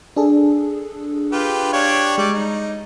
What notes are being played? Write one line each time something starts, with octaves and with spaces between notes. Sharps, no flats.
D4 G#4 A4
F4 G4 B4
D4 G4 C#5 F5
G3 G#3 D5
D#4